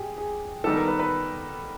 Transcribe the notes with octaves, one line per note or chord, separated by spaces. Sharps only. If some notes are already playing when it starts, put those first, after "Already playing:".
Already playing: G4 G#4
G#4
D#3 G3 B3 D#4 A4
A#4
B4
B4